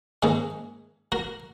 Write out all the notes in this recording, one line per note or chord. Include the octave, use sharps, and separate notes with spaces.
G#2 D#3 A#3 C#4 G#4 B4
F#4 A#4